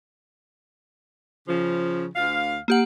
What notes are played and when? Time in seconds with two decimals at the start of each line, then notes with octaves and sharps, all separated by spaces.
1.47 C#3 F3
2.14 D2 F5
2.68 A#3 G4 F#5